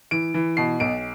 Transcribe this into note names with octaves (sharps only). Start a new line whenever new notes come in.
E3 D7
E3
B2 C7
B1 D7